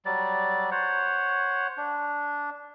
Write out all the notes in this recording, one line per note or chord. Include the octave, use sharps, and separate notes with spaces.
F#3 G3 D5
C5 C#5 F#5
D4